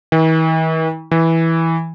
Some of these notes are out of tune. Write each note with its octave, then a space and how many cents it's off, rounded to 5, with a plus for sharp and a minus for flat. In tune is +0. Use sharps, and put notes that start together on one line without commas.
E3 -45
E3 -10